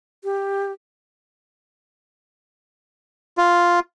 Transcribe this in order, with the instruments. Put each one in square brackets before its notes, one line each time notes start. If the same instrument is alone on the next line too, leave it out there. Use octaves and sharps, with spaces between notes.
[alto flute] G4
[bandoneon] F4